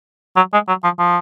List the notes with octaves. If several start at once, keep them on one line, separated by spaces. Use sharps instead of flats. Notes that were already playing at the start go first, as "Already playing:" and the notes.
F#3
G#3
F#3
F3
F3